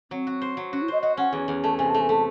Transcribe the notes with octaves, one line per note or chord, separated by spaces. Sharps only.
F#3 C4
F#4
C5
F#3
C#4 F#4
E4
C5 D#5
F#4 D#5
C#4 F#5
E2
E2
A3 A5
C3 G#5
A3 A5
G#5
A3 A5